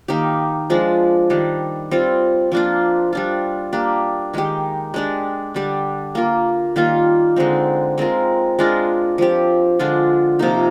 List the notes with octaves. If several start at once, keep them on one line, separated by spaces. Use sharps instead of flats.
D#3 A#3 D#4 G4
F3 G#3 D4
D#3 G3 D4
G3 C4 F4
F3 A#3 D4 F4
G3 D4 F4
A#3 D4 G4
D#3 G#3 D#4 G4
G#3 D4 G4
D3 G3 D4 G4
A#3 F4 A#4
D#3 G3 A#3 F4
D3 G#3 C4 D#4
G#3 C4 F4 A#4
G#3 D4 F4 A#4
F3 C4 G4
D3 G#3 D4 F4
C3 F3 A#3 D#4